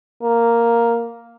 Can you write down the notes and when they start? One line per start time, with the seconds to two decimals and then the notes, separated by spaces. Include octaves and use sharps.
0.23 A#3